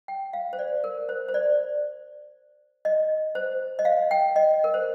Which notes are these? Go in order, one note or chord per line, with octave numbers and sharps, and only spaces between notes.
G5
F5
C5
D5
A#4
C5
C5
D5
D#5
C5
D#5
F5
G5
D#5
A#4
C5